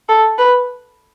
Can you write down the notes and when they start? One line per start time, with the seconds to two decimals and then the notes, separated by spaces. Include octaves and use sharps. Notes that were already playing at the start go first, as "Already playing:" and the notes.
0.09 A4
0.38 B4